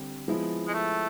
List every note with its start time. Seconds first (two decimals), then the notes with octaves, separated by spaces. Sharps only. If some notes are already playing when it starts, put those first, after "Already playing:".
Already playing: D3 G3 C4
0.28 F3 G#3 B3 E4
0.68 G#3
0.74 A3